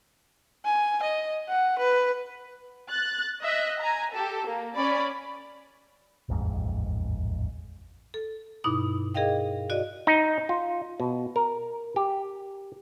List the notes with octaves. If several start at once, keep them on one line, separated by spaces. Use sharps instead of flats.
G#5
D#5
F#5
B4
F#6 A6
D#5 E5 F#6
G#5 A#5
G4 A4
A#3
C#4 D5 B5
D#1 A1 F2 G#2
A4
G2 B2 D#4 E4 D6 D#6
G#4 A#4 D#5 F5 G5
F#4 D5 D#5
D#4
F4
B2
A#4
G4